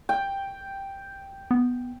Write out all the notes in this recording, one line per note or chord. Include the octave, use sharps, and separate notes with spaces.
G5
B3